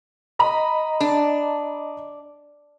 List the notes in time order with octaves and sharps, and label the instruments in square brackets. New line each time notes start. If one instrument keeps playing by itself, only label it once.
[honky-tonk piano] D#5 A#5 B5
[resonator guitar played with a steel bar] D4